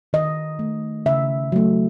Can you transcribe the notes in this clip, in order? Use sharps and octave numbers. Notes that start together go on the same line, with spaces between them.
D#3 D#5
A3
C#3 E5
F#3 A3